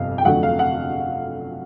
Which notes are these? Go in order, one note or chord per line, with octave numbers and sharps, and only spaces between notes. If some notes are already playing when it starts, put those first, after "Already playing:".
Already playing: G1 F2 C3 F5
G5
F2 D3 F#3 A3 F#5
F5
F#5